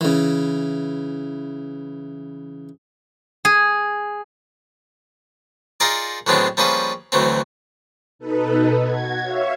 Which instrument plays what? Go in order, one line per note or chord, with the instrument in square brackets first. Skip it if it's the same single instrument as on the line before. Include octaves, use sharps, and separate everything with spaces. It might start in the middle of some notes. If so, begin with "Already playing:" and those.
[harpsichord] C#3 E3
[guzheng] G#4
[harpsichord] D#4 F4 G#4 A#4 D5
A2 F#3 G#3 B3 C4 D4
F3 G3 A#3 C#4 G#4 B4
D2 E3 F#3 A3 C4
[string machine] B2 D#4 A4 B4
F#4 G#6
C#5 E5 F5 C#6